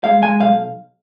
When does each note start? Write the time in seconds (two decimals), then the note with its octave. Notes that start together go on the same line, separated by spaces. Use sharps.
0.04 G#3 F5
0.22 G#3 G#5
0.40 B1 F5